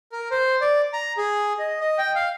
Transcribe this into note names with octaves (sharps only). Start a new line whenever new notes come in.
A#4
C5
D5
A#5
G#4
D#5
D#5
G5
F5